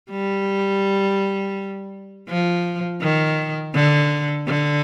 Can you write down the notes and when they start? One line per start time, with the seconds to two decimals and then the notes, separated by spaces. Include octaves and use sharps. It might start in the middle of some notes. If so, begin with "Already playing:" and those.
0.10 G3
2.29 F3
3.02 D#3
3.75 D3
4.47 D3